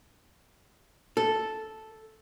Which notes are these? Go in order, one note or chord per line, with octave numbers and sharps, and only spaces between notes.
A4